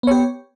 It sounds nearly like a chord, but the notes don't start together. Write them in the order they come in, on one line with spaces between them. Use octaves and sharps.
B3 C#5 G4